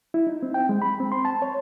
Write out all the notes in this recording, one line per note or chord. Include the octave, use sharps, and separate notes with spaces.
E4
D#4
C4
G5
G#3
B5
C4
C6
A5
C#5